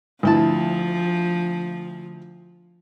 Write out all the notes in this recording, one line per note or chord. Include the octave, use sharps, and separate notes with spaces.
D2 F3 E4 A5